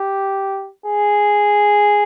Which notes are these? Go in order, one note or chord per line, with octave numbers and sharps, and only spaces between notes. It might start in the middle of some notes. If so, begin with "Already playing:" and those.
Already playing: G4
G#4